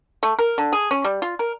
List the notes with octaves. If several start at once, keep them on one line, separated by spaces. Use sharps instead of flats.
A3
A#4
D3
G#4
C#4
G3
F4
A#4